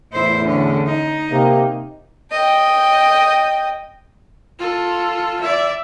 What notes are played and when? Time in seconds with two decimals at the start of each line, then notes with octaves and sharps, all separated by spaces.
0.13 E2 A2 E4 C5
0.46 D3 C#4
0.87 D#4
1.31 C3 A#3
2.32 D#5 G5
4.59 F4 A4
5.41 D5 E5